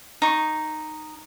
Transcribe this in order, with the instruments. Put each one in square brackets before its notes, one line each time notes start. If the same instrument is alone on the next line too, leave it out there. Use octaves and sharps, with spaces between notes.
[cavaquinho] D#4 C#6